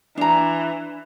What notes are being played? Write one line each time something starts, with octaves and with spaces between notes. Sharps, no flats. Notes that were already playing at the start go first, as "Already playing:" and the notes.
E3 D4 A#5